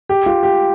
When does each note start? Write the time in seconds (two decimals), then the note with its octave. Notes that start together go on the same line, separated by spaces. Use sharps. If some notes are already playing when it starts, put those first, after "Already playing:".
0.09 G4
0.26 F4
0.43 G4